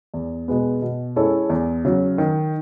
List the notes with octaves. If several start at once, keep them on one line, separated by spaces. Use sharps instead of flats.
E2
B2 G#3 B3
B2
G#3 C#4 E4 A4
E2
C#3 F#3
D#3